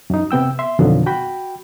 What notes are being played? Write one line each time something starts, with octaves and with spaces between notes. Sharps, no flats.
F#2 D#4
C3 B3 G5 E6
E5 C6
F2 B2 D3 D#3 F3 F#3
F#4 G5 B5